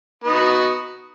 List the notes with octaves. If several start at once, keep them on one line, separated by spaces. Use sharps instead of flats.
B3 D#4 F#4